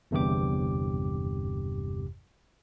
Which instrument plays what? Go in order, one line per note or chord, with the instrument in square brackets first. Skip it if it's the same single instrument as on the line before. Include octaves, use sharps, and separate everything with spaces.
[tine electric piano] G1 E2 G2 C3 G4 D6